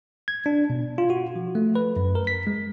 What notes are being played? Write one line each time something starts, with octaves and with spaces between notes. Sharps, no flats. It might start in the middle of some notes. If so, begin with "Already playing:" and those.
G#6
D4
B2
F4
F#4
F3
A3
B4
F#2
A#4
B6
G#3